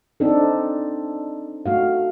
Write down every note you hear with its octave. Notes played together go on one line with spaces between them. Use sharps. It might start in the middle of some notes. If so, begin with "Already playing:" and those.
C4 D4 D#4 A4
A3 F#4 F5